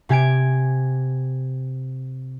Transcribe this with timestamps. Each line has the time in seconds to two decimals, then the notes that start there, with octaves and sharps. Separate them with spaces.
0.09 C3 G4 G#5 G#6 D7